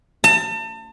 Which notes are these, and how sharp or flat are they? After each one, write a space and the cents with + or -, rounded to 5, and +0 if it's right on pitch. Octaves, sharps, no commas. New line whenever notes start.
A5 +35